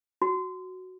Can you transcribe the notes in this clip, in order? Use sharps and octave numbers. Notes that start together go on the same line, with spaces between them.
F#4